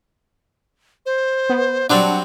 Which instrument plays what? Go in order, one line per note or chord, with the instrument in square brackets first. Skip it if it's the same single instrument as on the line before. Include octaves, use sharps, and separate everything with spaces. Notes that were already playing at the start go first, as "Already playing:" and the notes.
[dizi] C5
[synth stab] B3
[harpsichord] F#3 G3 C4 [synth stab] D4 [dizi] F#5